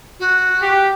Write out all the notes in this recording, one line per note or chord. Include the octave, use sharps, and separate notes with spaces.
F#4
G4